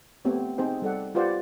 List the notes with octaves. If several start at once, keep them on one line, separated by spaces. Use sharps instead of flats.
A3 B3 C4 G4 C#5
C4 D#4 G#4 C5 G5
G3 A4 D5 F#5
F4 G4 B4 C5 D5 F#5